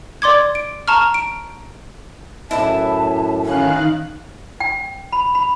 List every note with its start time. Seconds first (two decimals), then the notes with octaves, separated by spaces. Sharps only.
0.22 D5 C6 D6 G#6
0.55 D7
0.88 A5 A#5 C#6 F6
1.14 D7
2.51 F#2 A2 E4 B4 E5 A5
3.45 D#3 C#4 F5 F#6
4.60 G5
5.12 B5
5.35 B5